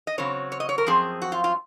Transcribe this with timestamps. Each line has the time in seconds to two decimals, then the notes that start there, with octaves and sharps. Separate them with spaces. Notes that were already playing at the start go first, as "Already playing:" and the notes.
0.07 D#5
0.18 C#3 F#3 C4 C#5
0.52 C#5
0.60 D#5
0.69 C#5
0.78 A#4
0.86 F#2 F3 C4 G#4
1.22 F#4
1.32 F4
1.44 F4